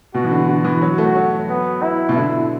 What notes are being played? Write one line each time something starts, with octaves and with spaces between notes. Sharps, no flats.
B2 F#4
E3
D3
D3 F#4
E3
F#3
A3
F#3
B3
E4
B2
D3 E4